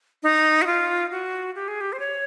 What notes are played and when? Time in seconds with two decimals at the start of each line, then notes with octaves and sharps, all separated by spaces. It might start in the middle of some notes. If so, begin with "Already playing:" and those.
0.23 D#4
0.62 F#4
0.67 F4
1.11 F#4
1.55 G4
1.68 G#4
1.81 G4
1.93 C5
2.00 C#5